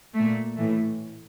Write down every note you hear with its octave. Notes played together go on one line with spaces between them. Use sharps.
A3
A#2
A2 E3 A3